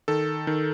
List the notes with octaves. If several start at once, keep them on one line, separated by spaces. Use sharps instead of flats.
D#3 A4
D#3